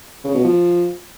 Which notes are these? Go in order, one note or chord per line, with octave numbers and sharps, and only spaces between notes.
C#3
B2
F3